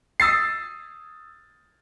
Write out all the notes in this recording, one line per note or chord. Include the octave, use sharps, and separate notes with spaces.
D#6 E6 A6 C7